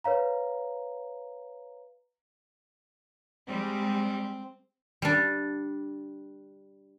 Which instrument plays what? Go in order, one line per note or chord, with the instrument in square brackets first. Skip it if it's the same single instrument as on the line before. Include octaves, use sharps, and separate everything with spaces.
[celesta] B4 C#5 F5 A#5
[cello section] G3 G#3 [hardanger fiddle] C4
[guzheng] G3 D4